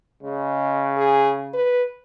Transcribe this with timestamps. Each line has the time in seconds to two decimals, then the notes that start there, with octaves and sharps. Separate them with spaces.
0.23 C#3 G#3
0.97 G#4
1.54 B4